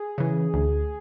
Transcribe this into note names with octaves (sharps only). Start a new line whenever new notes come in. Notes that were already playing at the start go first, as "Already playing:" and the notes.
Already playing: G#4
C#3 E3
D2